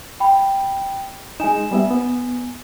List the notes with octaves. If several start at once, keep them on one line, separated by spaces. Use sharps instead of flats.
G5 B5
G#3 D#4 G#5 E7
G3 B3 E5
B3